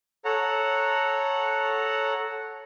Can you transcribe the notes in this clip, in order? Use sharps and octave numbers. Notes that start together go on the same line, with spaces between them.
A4 C#5 F#5 A#5